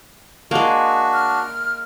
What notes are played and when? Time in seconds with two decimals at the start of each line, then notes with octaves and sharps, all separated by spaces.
0.51 G#3 A#3 D4 F#4
1.13 F6